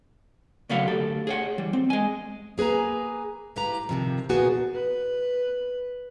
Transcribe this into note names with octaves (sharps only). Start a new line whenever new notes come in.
C#3 F#3 A3 B4 F5 F#5
D2 G4 A4
G#4 C#5 F#5
E3 G3
C4
G#3 G#5
A#3 G#4 B4 G#5 A#5
A2 G4 B4 F5 A#5
F2 A2 C3 D#3 F3
A#2 F3 A#3 B3 F#4 G#4
B4